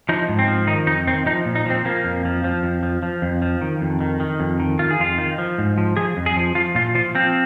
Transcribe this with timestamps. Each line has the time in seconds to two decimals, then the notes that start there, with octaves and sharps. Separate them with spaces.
0.09 F3 D#4
0.29 G#2
0.39 C4
0.48 F3
0.67 D#3 D#4
0.87 F2 D#4
1.07 D#3 C4
1.26 F3 D#4
1.46 A#2
1.55 D#4
1.66 F3 C4
1.85 F3 A#3
2.04 F2
2.25 F3
2.44 F3
2.63 F2
2.83 F3
3.03 F3
3.22 F2
3.42 F3
3.61 D#3
3.81 F2
4.01 D#3
4.20 D#3
4.40 F2
4.60 D#3
4.79 D#3 F4
4.91 G#4
4.99 F2 F4
5.18 D#3
5.38 F3
5.58 G#2
5.78 F3
5.97 F3 G#4
6.17 F2
6.26 G#4
6.37 F3
6.55 F3 F4
6.75 A#2 F4
6.95 F3 F4
7.15 F3 C4